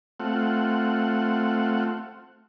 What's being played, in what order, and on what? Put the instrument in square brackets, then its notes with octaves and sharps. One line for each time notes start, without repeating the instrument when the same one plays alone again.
[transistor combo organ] A3 C4 F4 F#5